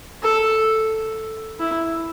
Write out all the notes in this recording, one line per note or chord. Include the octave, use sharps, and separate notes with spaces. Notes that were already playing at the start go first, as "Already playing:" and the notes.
A4
E4